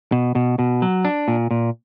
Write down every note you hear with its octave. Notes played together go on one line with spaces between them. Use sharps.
B2
B2
B2
F#3
D4
A#2
A#2